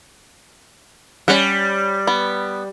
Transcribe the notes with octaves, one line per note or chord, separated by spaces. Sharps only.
G3 C#4 F#5
B3